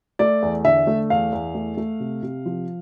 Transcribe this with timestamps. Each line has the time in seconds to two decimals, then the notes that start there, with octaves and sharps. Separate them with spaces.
0.19 A3 D5
0.42 E2
0.65 D3 E5
0.87 A3
1.10 E2 F5
1.32 E2
1.54 A3
1.77 A3
2.00 C3
2.23 C3
2.46 F3